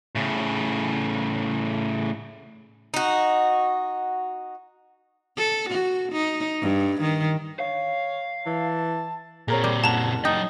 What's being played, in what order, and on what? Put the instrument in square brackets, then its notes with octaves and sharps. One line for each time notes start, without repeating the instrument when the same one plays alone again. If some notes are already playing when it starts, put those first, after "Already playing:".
[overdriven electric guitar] A2 C#3
[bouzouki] D#4 F#4
[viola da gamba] A4
F#4
D#4
G2
D#3
[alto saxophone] C#5 [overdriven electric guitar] F5
[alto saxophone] E3 [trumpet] A5
[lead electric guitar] A#2 C4 [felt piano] G#4 A#4 C#5
[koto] G3
[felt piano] F#1 F#5 E7 [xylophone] A5 A#5
[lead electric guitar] F#3 G5 [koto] D#4